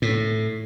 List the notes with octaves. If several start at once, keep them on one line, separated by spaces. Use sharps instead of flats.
A2